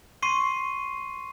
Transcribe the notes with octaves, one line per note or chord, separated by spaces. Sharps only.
C6 C#6 C7 D#7